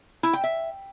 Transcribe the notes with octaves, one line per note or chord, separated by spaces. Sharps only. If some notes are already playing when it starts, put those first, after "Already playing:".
E4
G5
E5